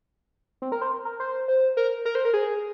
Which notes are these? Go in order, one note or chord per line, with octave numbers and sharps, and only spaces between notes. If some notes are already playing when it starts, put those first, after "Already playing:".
C4
A#4
C5
A#4
C5
C5
A#4
A#4
C5
A#4
G#4